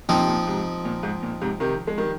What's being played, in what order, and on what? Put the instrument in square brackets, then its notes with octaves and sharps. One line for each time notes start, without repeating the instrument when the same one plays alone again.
[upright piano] A#2 [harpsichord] F3 C4 D#4
[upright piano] C3
A#2
G#2 C3
A#2
G#2
A#2
G#2 C3
C3 D#3
G#3
D#3 G3